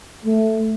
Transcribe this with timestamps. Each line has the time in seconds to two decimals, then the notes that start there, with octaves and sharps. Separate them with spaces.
0.24 A3